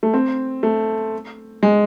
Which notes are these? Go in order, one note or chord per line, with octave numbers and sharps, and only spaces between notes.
A3
C4
A3
G#3